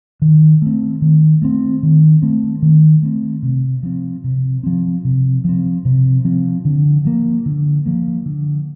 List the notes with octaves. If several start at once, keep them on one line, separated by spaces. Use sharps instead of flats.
D#3
A3 C4
D#3
A3 C4
D#3
A3 C4
D#3
A3 C4
C3
F3 C4
C3
F3 C4
C3
F3 C4
C3
F3 C4
D3
F3 A#3
D3
F3 A#3
D3